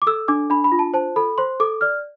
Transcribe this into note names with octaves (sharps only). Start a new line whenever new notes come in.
D6
A4 E6
D4 D6
D4 B5
B5
F4
A5
C5 A5
A4 B5
C5 C6
A4 D6
D5 F6